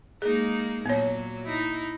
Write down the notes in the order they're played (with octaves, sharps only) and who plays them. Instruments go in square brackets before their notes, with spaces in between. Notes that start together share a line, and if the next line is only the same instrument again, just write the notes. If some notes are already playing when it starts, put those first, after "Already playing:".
[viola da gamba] G#3 A#3 D#4 [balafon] G#4
[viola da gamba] A#2 F#3 [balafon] B3 C#5
[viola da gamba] D#4 E4